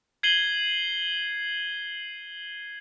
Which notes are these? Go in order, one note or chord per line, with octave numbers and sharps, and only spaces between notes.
G#6 C7 D#7 F#7 G7